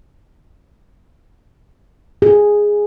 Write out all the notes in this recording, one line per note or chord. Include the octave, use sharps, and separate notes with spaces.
G#4